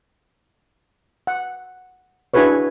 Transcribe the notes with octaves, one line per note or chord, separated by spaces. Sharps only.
F#5
D4 E4 F#4 G#4 B4 C#5